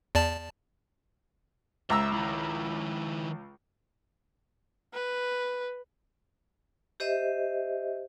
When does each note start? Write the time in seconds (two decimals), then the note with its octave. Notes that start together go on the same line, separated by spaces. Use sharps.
0.15 E2 D5 A5
1.90 C#2 E5 A#5 E6
2.14 D#3 E4
4.94 B4
7.00 G4 C5 D#5 E5